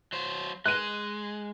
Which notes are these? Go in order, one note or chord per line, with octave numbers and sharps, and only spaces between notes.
F#3 C5
G#3 F#6 D#7